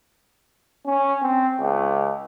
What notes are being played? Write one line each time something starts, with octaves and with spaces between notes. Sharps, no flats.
C#4
C4
C#2